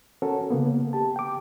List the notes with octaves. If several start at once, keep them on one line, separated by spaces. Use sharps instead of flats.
C#4 F#4 A4 A#4
C#3 A#3 B3
G4 A5
G5 D6